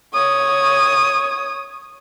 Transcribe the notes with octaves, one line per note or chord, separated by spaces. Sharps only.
C#5 D#6